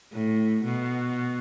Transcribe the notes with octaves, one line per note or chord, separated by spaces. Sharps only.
A2
B2